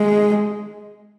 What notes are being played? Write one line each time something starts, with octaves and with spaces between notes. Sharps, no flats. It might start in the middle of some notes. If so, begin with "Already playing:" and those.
Already playing: G#3